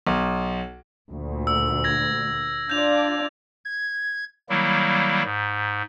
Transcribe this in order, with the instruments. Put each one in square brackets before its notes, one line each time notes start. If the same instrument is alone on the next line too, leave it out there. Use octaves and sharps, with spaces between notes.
[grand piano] B1
[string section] D2 A#2
[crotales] E6
G#6 A#6
[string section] D4 F4 D5 [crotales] G6 F7
[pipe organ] G#6
D#3 F#3 G3 A#3 E4
G#2